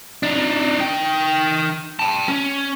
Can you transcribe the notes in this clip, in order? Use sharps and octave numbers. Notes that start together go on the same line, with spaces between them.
D4 D#4
D#4 G5
G5 A5
C#4